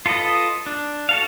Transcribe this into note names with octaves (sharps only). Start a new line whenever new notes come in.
F4 A4 B4 D#5
D4
F#4 A4 F5